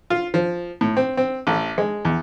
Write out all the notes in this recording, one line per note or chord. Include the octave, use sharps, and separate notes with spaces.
F4
F3
A2
C4
C4
A1
G#3
E2